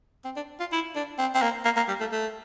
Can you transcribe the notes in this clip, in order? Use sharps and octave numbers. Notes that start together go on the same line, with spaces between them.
C4
D4
F4
E4
D4
C4
C4
A#3
A#3
A#3
G3
A3
A3